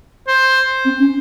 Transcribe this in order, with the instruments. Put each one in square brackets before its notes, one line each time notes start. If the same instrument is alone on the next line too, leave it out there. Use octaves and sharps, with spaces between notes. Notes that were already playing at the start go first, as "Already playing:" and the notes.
[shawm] C5
[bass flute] C4
C#4